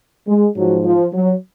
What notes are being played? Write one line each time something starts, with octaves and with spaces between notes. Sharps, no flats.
G#3
G#2 F3 F#3
F3
F#3